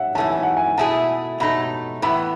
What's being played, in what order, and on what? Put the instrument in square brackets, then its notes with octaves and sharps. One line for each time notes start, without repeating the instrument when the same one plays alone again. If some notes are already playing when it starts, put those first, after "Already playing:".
Already playing: [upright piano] E5 F#5
[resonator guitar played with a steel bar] F#2 E3 A3 C#4 [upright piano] A5
[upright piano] G#5
F#5
G#5
[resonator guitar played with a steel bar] B2 A3 E4 G#4 [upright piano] A5
[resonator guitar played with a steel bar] B2 A3 D#4 [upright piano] B5
[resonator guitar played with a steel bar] A2 E3 B3 [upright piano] B5